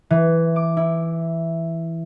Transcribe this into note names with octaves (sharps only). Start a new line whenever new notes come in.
E3
D6
E4